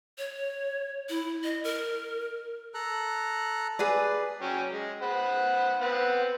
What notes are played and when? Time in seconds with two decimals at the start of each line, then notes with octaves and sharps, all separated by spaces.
0.18 C#5
1.09 E4
1.44 D#5
1.64 A#4
2.74 A4 A#5 F#6
3.79 G#4 B4 D5
4.42 F#3 C#4 G5
4.72 G#3
5.02 C5 F#5 B5
5.81 B3 C4 F#5